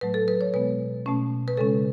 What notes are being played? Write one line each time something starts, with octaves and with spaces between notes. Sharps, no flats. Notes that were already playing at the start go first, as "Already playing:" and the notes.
A2 F#3 A3 B4
A4
B4
C#5
B2 G#3 B3 B4
B2 A3 C#4
B4
C#3 G#3 C#4 A4